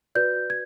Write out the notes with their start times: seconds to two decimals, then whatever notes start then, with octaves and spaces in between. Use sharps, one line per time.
0.15 F#4 B4 D5 G6
0.50 G#6